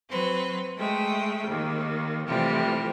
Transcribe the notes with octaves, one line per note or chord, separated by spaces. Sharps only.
F#3 C4 B4
G#3 A3 G5
D#2 D#3
A2 C3 E3 F3 G3